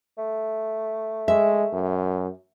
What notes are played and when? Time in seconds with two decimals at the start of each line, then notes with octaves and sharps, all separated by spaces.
0.18 A3
1.28 G#3 E5
1.73 F#2